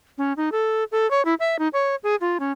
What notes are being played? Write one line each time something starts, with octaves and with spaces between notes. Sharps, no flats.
C#4
D#4
A4
A4
C#5
E4
E5
D#4
C#5
G#4
F4
C#4